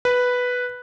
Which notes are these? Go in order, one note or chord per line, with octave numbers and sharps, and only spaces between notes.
B4